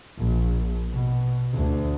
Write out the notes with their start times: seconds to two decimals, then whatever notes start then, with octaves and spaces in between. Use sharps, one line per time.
0.18 A#1
0.91 B2
1.54 D2